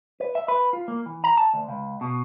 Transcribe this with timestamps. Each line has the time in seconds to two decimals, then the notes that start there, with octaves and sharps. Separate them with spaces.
0.20 B4
0.35 E5
0.48 B4
0.73 F4
0.88 A#3
1.06 E3
1.24 A#5
1.37 A5
1.54 D2
1.68 C#2
2.01 B2